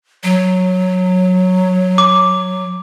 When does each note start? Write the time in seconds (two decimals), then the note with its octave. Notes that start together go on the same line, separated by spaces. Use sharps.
0.23 F#3
1.98 D6